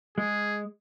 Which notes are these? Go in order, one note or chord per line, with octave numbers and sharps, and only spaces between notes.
G#3 G#4